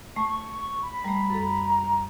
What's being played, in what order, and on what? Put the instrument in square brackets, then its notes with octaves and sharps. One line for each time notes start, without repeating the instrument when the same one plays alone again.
[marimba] A3 [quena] C#6
[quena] C#6
[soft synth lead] B5
[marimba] G3 A3 [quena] A#5
[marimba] F#2 A4